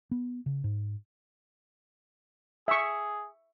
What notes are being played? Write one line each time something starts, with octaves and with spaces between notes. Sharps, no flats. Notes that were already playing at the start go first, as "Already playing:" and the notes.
B3
C#3
G#2
G#4 E5 C#6